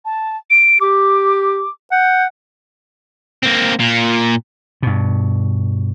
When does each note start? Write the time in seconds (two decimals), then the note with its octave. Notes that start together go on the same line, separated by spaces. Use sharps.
0.05 A5
0.50 D7
0.81 G4 D6
1.92 F#5 G6
3.43 A#3 C4
3.80 A#2
4.83 G2 B2